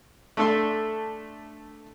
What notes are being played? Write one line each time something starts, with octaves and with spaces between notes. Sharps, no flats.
A3 D4 A4 E5 C6